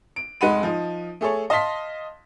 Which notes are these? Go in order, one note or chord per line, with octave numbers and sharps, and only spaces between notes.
D7
F1 G#3 D#4 F#5 B5 D#7
F3 D#4
A3 G#4 A4 C#5
D#5 F5 A5 C6 B6